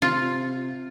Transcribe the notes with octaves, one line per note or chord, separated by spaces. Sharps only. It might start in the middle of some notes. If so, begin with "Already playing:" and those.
C3 F4